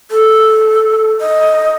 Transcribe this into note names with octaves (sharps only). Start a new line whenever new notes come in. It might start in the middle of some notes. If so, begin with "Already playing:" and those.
A4
D#5